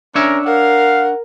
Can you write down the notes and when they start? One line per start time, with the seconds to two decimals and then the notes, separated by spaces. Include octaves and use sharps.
0.15 C#4 D4 A#4 C#5 E5
0.46 A#4 F5 F#5